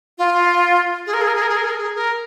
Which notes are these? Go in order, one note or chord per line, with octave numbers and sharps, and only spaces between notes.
F4
G#4
A#4
G#4
A#4
G#4
A#4
G#4
A#4
G#4
A#4
G#4
A#4